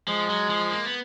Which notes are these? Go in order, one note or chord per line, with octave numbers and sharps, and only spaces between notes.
F3 G#3
F#3
F3
A#3
B3